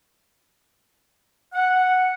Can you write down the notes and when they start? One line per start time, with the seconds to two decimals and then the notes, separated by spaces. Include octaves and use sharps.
1.54 F#5